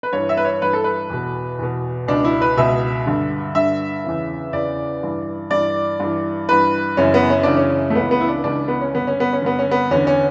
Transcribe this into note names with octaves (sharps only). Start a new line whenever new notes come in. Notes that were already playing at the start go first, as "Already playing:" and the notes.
B4
G2 E3 C#5
E5
B4
C#5
G2 E3 B4
A4
B4
E2 B2
E2 B2
C#2 B2 D4
E4
B4
C#2 B2 E5
G2 D3
G2 D3 E5
E2 C#3 E3
E2 C#3 E3 D5
G2 E3
G2 E3 D5
G2 E3
G2 E3 B4
F#2 C#3 E3 C#4
B3
C#4
F#2 C#3 E3 D4
C#4
A3
C#2 C#3 E3 B3
B3
E4
D4
C#2 C#3 E3 D4
B3
C#4
G2 D3 B3
C#4
B3
C#4
G2 D3 B3
C#4
B3
E2 D3 C#4
C#4